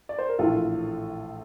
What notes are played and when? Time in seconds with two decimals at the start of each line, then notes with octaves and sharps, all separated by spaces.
0.09 D5
0.19 C5
0.29 A#4
0.39 A#1 A2 E3 F4 A4